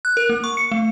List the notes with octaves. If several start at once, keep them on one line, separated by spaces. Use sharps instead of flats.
F#6
A#4
A#3
C#6
C#7
A3